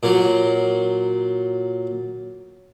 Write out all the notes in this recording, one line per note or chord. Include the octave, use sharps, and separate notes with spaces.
A#2 F#3